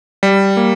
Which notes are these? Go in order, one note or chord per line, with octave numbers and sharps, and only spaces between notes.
G3
A#3